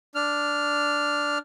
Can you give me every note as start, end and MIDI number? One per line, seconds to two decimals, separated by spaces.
0.15 1.38 62
0.15 1.38 89